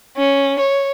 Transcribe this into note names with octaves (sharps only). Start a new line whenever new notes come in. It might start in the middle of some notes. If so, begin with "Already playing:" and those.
C#4
C#5